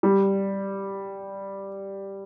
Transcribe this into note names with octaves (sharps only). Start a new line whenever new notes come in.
G3